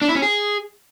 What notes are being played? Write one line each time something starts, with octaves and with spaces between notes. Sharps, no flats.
D4
E4
C#4
G#4